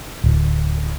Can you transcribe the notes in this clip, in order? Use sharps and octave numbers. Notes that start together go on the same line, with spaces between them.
D1